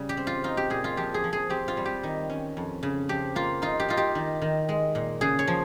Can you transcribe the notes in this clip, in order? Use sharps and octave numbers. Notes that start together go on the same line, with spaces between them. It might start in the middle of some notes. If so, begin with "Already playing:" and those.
Already playing: C#3 G3
G4
C4
F4
D#4 F4
G4
A#2 G#4
F4
F3 G4
G#4
F3
G#4
C4 G4
F4
G3
G4
D#3
C#4
F2
C#3
F3 G4
A#3 F4
D#4 F4
G4
D#4 F4
G4
D#3
D#3
G#3
A#2
C#3 G#4
C#5
F3